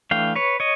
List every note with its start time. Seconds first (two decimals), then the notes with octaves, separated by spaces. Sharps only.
0.11 E3 A3 D4 F5 G5
0.35 B4 C#5
0.60 C#5 D#5